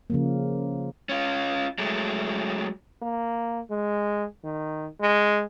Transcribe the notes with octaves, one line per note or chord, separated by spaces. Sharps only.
C#3 F3 A#3
C#4 F4
F#3 G#3 A3
A#3
G#3
D#3
G#3